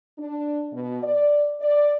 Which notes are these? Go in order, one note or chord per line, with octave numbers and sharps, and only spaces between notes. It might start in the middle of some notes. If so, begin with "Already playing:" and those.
D4
B2
D5
D5